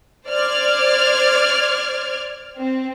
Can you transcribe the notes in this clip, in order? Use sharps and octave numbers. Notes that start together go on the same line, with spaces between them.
C5 D5 F6 G#6
C4